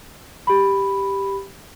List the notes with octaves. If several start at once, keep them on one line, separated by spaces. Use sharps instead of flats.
G4 B5